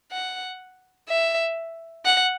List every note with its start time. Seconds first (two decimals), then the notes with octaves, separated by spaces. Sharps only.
0.12 F#5
1.09 E5
2.05 F#5